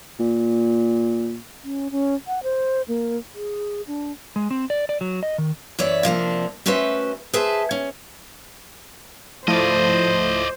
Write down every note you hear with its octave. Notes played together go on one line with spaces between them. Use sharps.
A#2
C#4
C#4
F#5
C5
A#3
G#4
D4
G#3
C4
D5
D5
F#3
D#5
D#3
F#2 E3 C#5 D5 E5
C3 F3 A#3 D4
A3 C#4 F#4 B4 C5 E5
G#4 B4 C5 E5 A5
C#4
F3 A3 E4 C5 D5 D#5